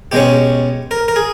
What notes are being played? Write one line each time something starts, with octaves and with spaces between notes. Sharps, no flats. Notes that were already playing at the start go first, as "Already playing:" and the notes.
B2 G#3 C#4 G4
A#4
A#4
G#4